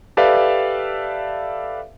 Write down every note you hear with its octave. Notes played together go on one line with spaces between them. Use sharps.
G4 A4 B4 D5 E5 F5